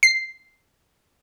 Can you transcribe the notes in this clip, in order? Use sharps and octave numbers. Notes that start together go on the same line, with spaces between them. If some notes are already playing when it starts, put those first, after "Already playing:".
C7